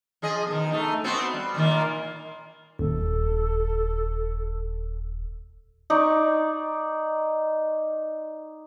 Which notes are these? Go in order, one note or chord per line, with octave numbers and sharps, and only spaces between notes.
F3 G#4 D#5
B2 D#3
A3 D#4
B3 C4 F#4
G3
A#2 D#3 A#3
D#1 A4
D#4 D5 C#6